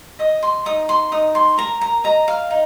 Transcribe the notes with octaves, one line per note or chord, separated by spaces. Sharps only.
D#5 D#6
C6
D#4 D#6
C6
D#4 D#6
C6
A#4 A#5
A#5
D#5 A#5
F5
D#4